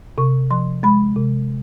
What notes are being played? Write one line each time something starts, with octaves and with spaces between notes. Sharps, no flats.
C3 C#6
F3 C6
G#3 B5
C3